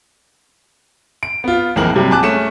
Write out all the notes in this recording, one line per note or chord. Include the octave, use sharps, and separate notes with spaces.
D7
B3 F4
A#1 F2 E3 G#3 A#4 F#7
G2 C3 F#3
A#1 G#5 A5 D6 F#6
A3 C#4 G#4 C#7 E7